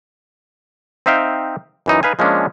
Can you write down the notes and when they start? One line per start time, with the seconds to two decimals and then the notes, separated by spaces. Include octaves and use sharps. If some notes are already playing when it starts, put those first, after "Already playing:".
1.06 C4 D#4 E5 F5 G5
1.86 F#2 E3 D#4
2.03 D#4 B4 F5 G#5
2.19 F3 G#3 A#3 C#4 D4